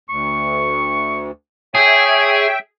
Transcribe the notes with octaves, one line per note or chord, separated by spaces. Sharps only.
D2 C#6
G#4 C#5 E5 G5